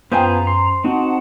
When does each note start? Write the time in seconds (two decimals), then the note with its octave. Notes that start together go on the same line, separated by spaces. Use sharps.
0.12 F#2 B3 F4 G#4 C5 G5 G#5 A#5
0.47 C6
0.84 C4 D#4 F#4 F#5 A5